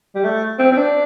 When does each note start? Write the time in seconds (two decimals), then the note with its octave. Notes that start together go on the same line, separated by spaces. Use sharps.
0.15 G3
0.24 A3
0.59 C4
0.72 C4
0.77 D4